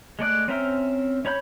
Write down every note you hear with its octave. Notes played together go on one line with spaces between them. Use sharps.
G#3 A3 D5 F#6
C4 C#4 A#4 C5 E5
C#4 C#5 B5 G6